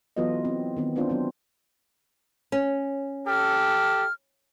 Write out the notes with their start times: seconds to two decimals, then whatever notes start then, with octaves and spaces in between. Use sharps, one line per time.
0.16 E3 F#3 B3 F4 A4 D#5
0.45 C4
0.77 D#3 B3 C4
0.96 B3 C4 D4 F4 C5
1.09 F#3 B3 C4
2.52 C#4
3.27 G4 A4 F6